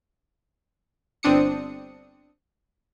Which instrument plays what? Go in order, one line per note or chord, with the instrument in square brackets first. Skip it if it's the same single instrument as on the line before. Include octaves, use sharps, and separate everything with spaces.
[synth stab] G1 C4 D4 D#6 C#7